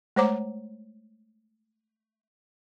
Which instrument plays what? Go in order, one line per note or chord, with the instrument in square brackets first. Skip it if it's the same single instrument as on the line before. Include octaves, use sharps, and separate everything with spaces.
[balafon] G#3 A3 C5 C#5 A#5 D6